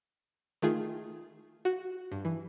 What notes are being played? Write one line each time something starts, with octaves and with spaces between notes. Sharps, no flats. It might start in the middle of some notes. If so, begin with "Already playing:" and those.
D#3 A3 F4 G#4
F#4 F#6
G2
E3